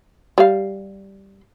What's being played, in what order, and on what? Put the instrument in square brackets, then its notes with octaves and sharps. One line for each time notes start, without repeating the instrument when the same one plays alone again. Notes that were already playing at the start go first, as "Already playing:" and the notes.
[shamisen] G3 F5